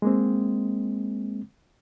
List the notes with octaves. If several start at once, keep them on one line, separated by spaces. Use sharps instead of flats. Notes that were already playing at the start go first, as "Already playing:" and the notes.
G#3 A#3 C4